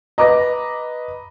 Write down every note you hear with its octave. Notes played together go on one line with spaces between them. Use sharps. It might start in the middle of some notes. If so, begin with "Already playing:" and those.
B4 D#5 A#5 D6 A#6